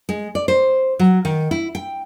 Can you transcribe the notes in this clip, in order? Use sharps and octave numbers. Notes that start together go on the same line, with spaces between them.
G#3
D5
C5
F#3
D#3
E4
G5